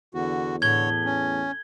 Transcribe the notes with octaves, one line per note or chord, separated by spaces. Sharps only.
E2 D3 F#4
A2 D3 C#5 G#6 G7
C#4